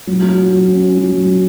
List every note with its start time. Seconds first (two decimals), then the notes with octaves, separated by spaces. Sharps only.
0.07 F#3
0.22 F#3
0.38 F#3
0.53 F#3
0.67 C#4
0.82 C#4
0.97 F#3
1.12 F#3
1.27 F#3